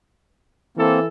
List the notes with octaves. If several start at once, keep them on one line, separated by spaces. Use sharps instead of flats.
E3 A#3 C4 A4